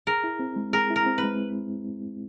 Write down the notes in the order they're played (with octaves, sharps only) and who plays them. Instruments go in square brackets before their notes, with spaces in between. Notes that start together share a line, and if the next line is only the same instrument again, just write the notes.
[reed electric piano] G#4 [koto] A#4
[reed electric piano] E4
C4
G#3
[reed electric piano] G#4 [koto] A#4
[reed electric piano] E4
[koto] A#4
[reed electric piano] C4
[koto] B4
[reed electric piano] G#3